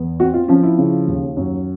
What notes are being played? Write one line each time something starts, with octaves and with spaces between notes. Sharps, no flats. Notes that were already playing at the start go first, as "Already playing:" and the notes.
Already playing: E2 B3
C4 F#4
F4
F3 C#4
E4
C#3
D#2
F#2